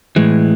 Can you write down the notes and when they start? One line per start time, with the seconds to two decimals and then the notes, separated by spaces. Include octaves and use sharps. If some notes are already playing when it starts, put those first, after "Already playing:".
0.16 A2 E3 G#3